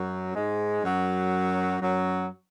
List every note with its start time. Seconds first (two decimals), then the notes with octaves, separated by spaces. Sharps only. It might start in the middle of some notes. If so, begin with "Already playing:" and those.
Already playing: F#2 F#3
0.34 G#2 G#3
0.83 F#2 F#3
1.80 F#2 F#3